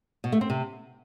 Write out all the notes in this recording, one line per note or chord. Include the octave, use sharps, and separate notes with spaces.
B2
A3
C4
C3